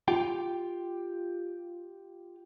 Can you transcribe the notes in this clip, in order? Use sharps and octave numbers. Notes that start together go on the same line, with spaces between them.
F4 G4 G5